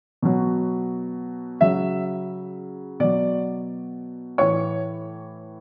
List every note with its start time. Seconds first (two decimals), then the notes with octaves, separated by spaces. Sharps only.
0.22 B2 F#3
1.61 C#3 F#3 E5
3.00 B2 F#3 D5
4.38 A2 E3 C#5